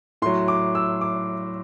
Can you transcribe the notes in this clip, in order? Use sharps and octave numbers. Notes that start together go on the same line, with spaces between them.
A2 F#3 C6
D6
E6
D6